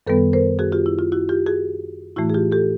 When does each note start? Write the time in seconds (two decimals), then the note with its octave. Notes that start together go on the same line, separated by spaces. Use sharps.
0.07 F#2 D#3 G3 B3 A4 B4
0.33 A#4 C5
0.59 F#4 G#4
0.72 F4 G4
0.86 E4
0.99 F4
1.12 E4 F#4
1.29 F4 G4
1.46 F#4 G#4
2.16 A2 E3 A3 E4 F#4
2.30 G#4
2.34 F4 G4
2.52 G4 A4